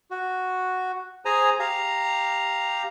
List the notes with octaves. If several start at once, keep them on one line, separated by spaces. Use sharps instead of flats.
F#4
G#4 C5 G#5 A#5
G4 F5 A#5